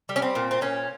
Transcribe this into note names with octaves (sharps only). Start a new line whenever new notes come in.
G3
C#4
C4
A#2
C4
A#2 C#4